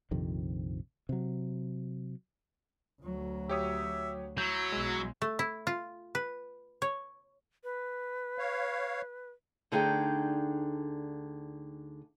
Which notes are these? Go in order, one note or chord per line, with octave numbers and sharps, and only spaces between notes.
A#1 F2 C3 D#3
C3 F#3
D2 F#3
G4 C#5 E5 D#6
F#3 E4 G6
B1 G#3
A3
E4
F4
B4
C#5
B4
C#5 F5
D2 D3 D#4 G#4 G5